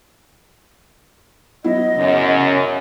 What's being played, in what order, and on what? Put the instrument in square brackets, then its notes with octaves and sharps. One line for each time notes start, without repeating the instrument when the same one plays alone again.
[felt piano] F#3 B3 E4 [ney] D#5
[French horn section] F#2 [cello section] C#3